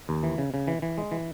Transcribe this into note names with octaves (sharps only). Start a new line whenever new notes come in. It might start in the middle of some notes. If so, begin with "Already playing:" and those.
D#2
E3
C#3
C#3
E3
E3
G#3
E3